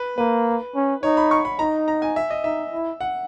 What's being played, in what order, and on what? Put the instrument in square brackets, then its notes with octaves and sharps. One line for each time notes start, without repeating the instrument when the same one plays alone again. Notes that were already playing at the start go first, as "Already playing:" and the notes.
Already playing: [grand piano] B4
[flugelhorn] A#3 [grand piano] B4
[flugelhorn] C#4
[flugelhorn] D#4 [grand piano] C#5
[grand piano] B5
C#6
B5
[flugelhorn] D#4 [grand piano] A#5
[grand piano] A#5
G#5
E5
D#5
[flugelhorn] D#4 [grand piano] E5
[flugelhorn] E4
[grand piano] F#5